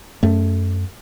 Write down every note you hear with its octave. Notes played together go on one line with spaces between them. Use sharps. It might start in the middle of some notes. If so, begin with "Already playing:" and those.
F#2 A3